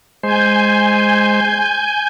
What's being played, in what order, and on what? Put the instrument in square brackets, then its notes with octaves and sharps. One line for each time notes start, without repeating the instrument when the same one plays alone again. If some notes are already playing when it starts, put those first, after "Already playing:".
[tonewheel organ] G#3 C5 [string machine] G#5 G6